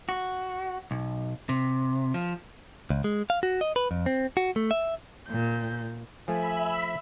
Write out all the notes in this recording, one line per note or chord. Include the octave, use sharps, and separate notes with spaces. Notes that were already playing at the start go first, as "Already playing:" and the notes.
F#4
B1
C3
F3
C#2
G#3
F5
F#4
D#5
B4
F2
C4
F#4
A3
E5
A#2 G6
F3 A3 E5 G#5 B5